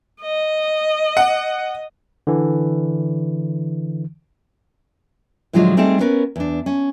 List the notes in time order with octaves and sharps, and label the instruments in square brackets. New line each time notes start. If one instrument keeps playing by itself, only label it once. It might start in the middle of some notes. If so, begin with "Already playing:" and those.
[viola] D#5
[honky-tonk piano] F#5
[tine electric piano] D3 E3
[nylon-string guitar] A2 D3 F3 F#3 G#3 F4
G3 A3 C4 D#4 G#4 A5
B3 C#4 A#4 B4
E2 D4
C#4